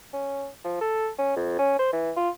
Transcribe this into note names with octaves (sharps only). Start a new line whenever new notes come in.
C#4
F3
A4
C#4
F2
C#4
C5
E3
F4